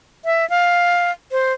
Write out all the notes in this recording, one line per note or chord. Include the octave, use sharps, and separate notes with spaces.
E5
F5
C5